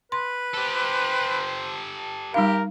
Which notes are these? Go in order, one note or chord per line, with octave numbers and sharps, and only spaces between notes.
B4 C6
G4 A4 C5
G3 D#4 G4 A#4 F5